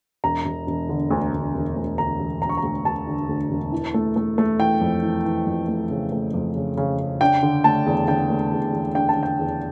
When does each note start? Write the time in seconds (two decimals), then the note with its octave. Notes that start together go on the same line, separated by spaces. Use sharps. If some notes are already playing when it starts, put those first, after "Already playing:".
0.24 E1 A#5
0.45 E1
0.67 E1
0.89 D3
1.10 D2
1.33 D2
1.54 E1
1.76 D2
1.98 D2 A#5
2.20 E1
2.42 E1 A#5
2.49 C#6
2.57 A#5
2.63 D2
2.85 E1 A5
3.07 D3
3.29 D2
3.51 E1
3.72 E3
3.94 A3
4.16 A3
4.38 A3
4.59 E3 G5
4.81 F2
5.03 E3
5.25 E3
5.47 F2
5.68 A3
5.90 C#3
6.12 A3
6.34 F2
6.55 C#3
6.77 C#3
6.99 C#3
7.21 D4 G5
7.43 D3
7.64 A3 A5
7.86 E2
8.08 D3 G5
8.30 A3
8.52 E2
8.73 E2
8.95 D4 G5
9.09 A5
9.17 D3
9.23 G5
9.39 E2